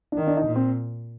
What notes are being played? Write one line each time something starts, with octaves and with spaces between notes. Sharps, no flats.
D4
D#3 D#4
D4
D#4
A#2
C4